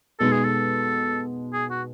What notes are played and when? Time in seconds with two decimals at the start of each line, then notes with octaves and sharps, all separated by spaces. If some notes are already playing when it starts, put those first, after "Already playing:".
0.20 B2 G#3 B3 D#4 A4
0.32 G#4
0.45 A4
1.53 G#4
1.70 F#4